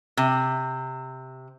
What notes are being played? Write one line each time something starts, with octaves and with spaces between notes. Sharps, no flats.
C3